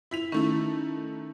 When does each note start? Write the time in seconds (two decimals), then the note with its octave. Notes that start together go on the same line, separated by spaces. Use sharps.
0.11 E4 B6 F7
0.32 D#3 A3 C#4 E4